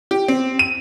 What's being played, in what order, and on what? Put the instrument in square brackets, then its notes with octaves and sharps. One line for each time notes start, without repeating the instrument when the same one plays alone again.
[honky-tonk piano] G4
C4
D#7